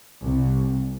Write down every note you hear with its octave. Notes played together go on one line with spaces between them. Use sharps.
C2